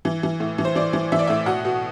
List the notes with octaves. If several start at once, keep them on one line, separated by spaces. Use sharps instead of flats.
E3
E3
A2
E3
C5
E3 D5
E3
E3 E5
D5
A2 E5
B2 F#5
B2